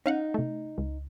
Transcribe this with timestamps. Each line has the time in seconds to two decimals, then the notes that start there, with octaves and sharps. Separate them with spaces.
0.06 C#4 D#4 F5 F#5
0.34 C3 A3
0.78 C#2